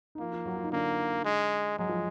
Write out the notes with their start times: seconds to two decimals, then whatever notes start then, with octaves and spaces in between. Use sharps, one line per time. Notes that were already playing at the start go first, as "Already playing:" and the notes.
0.15 D#4
0.19 F3 A#3 F4
0.33 F3 F4
0.46 F#3 F#4
0.57 F4
0.64 D#4
0.72 D3 A#3 D4
1.25 G#3
1.78 F#3 G#3
1.89 F3